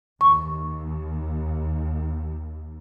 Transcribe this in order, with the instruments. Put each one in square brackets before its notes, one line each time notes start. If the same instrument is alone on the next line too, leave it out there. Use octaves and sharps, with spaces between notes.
[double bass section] D#2 [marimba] C#6